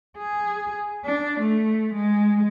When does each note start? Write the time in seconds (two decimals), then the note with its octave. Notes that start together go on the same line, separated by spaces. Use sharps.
0.18 G#4
1.05 D4
1.40 A3
1.94 G#3